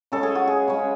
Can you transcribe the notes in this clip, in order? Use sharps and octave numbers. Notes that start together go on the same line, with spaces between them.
C#3 G#3 C#4 A4
G#4
F#4
G#4
C#3 G#3 C#4